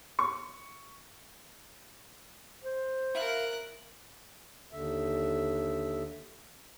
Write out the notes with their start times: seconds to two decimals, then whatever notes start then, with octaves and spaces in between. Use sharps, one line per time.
0.19 C#6
2.64 C5
3.15 E4 A#4 F5 F#6
4.73 D#2 D3 E5